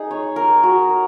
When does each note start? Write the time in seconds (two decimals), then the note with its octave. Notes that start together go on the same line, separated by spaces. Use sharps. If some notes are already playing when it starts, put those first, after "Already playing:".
Already playing: D#4 G#4
0.11 C#5
0.36 A#4
0.63 F#4
0.89 A#4